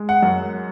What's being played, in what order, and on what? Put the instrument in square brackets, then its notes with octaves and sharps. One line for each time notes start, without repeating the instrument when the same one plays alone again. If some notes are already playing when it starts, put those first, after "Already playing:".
Already playing: [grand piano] G#3
F#5
F#2